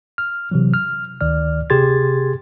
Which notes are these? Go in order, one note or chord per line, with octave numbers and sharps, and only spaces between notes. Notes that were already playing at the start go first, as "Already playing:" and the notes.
F6
C3 E3 F#3
F6
D2 D#3 D5 F6
C3 G4 G#4 C6 G#6 A6